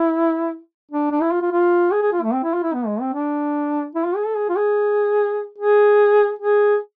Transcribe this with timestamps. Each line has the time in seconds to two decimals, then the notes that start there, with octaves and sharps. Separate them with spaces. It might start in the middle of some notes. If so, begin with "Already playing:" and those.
Already playing: E4
0.91 D4
1.11 D4
1.21 E4
1.31 F4
1.42 F4
1.52 F4
1.92 G#4
2.02 G#4
2.12 F4
2.23 A3
2.33 C4
2.43 E4
2.54 F4
2.63 E4
2.74 B3
2.87 G#3
3.01 C4
3.14 D4
3.95 E4
4.05 F4
4.15 G#4
4.26 A4
4.36 G#4
4.49 F4
4.56 G#4
5.58 G#4
6.39 G#4